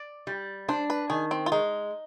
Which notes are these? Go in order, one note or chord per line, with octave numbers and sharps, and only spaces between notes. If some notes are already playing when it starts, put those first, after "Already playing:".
Already playing: D5
G3
D4 C5
B4
D#3 G#4
C4
F4
G#3 D#4